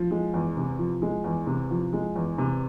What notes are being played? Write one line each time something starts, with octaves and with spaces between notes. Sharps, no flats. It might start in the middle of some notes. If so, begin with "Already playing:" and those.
Already playing: F3
G#3
E2
C3
F3
G#3
E2
C3
F3
G#3
E2
C3